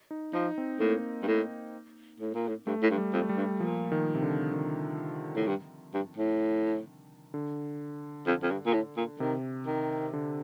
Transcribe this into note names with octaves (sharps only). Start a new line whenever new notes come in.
D#4
F3 D#4
C4
A2 A#3
G2
A2
A2
A#2
A2
G2 A3
A2
G2
G3
F2
A3
G3
G2
A#2 F3
D#3
C3
D3
D#3
A2
G2
G2
A2
D3
F2
F2
G2
A#2
A2
A#2
C3 D#3
D#3
D3